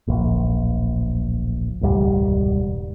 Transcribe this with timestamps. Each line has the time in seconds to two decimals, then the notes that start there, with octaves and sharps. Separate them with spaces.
0.07 D1 A#1
1.81 E1 C#2 G#2 G3